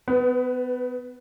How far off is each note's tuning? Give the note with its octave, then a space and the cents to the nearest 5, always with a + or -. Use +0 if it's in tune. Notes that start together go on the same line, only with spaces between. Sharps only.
B3 +30 B4 +0